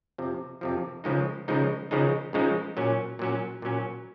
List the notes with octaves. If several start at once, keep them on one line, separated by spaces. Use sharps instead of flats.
F2 C3 F3
F2 C3 F3
C#2 C#3 F3 G#3 D#4
C#2 C#3 F3 G#3 D#4
C#2 C#3 F3 G#3 D#4
C#2 C#3 F3 G#3 D#4
A#2 F#3 C#4
A#2 F#3 C#4
A#2 F#3 C#4